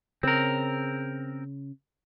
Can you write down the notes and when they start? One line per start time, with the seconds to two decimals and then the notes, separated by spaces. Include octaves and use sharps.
0.23 C#3 C4 A#4